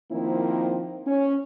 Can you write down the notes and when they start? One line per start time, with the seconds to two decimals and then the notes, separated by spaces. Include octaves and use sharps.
0.11 D#3 F3 A#3 C4 E4
1.07 C#4